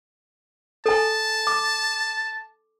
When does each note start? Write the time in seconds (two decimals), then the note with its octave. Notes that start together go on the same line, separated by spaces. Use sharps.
0.86 A4 G#5 A5
1.47 D6